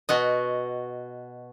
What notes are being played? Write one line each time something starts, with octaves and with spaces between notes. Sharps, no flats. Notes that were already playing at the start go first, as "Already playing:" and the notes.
B2 F#4 D#5